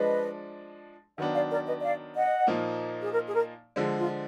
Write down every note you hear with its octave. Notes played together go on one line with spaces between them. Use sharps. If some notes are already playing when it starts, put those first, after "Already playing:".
Already playing: F3 G#3 D4 B4 D#5
D#3 F#3 B3 D4 B4 D#5
D5 F5
A#4 D5
B4 D#5
D#5
D5 F5
D#5 F#5
A#2 F3 A#3 D#4
G#4
A#4
G#4
A#4
D3 F3 G#3
F4